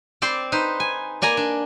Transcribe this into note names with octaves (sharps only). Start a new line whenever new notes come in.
C4 D5 G5 C6
D#4 B4 C5
G#5
A#3 D5 G#5 A#5
D4